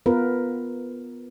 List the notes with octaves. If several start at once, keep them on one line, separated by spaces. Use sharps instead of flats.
B3 F4 A#4 B4